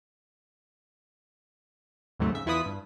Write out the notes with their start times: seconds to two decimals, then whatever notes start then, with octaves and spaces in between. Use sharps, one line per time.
2.20 D#2 G#2 C3 F#3 A3
2.32 C#3 E5
2.46 E2 E4 F4 B4 D#6 B6
2.66 G2